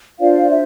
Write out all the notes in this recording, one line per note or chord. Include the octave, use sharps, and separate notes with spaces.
D4 F4 C5 D5 F5
E5